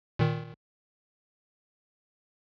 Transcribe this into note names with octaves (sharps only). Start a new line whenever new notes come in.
A#2 D#3